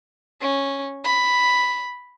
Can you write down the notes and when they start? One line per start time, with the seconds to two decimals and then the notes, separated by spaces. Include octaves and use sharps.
0.41 C#4
1.04 B5